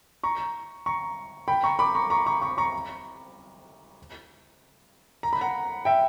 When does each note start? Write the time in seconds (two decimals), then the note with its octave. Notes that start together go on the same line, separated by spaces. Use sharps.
0.23 A#5 C#6
0.86 A#5 C#6
1.48 G5 B5
1.64 A#5 C#6
1.79 B5 D6
1.95 A#5 C#6
2.10 A#5 C#6
2.26 A#5 C#6
2.42 A#5 C#6
2.58 A#5 C#6
5.23 A#5
5.33 B5
5.41 F#5 A#5
5.85 E5 G5